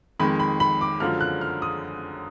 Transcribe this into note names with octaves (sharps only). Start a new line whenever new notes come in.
F2 D#3 G#3 B5
B5
B5
D6
F#2 D3 F3 G#3 F6
F#6
F6
D#6